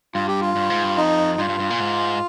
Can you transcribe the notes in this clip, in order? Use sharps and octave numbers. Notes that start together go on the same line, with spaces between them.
G2 F4
G4
F4
G2
G#2
G2
F2 D#4
G2 F4
G2
G2
A#2
G#2